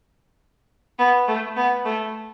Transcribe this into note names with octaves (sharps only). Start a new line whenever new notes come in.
B3
A3
B3
A3